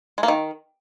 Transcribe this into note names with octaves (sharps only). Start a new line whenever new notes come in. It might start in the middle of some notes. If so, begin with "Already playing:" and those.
G#3
A#3
D#3